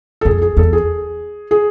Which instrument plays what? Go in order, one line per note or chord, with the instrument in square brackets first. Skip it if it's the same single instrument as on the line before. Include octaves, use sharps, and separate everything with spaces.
[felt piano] A4
[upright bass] F2 [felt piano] G#4
[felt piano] G#4
[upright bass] E2 [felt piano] A4
[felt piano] G#4
G#4